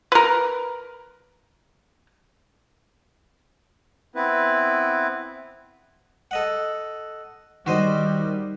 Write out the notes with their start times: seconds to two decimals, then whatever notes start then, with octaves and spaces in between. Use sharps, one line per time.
0.12 A#4 B4
4.16 B3 C4 E4 B4
6.31 A4 D#5 F#5
7.66 D#3 G3 F#4 C5 D#5